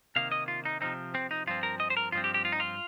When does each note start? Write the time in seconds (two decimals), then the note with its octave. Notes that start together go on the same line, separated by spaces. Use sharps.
0.16 C3 D#3 A#3 F5
0.32 D#5
0.48 F4
0.65 D#4
0.81 C3 F3 C4 D#4
1.15 C4
1.31 D#4
1.47 G2 F3 C4 F4
1.63 A#4
1.80 D#5
1.90 C5
1.97 A#4
2.12 G2 F3 C4 F4
2.24 G4
2.34 G4
2.45 F4
2.52 D#4
2.60 F4